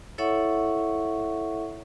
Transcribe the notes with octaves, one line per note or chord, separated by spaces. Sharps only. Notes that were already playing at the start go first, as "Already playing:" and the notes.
E4 A4 C#5 E5 F#5 C#6